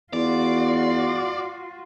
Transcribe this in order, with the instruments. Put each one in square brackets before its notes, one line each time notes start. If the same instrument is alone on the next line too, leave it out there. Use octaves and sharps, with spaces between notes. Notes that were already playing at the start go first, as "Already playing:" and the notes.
[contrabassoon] E2 [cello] F4 F#4 [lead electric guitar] D5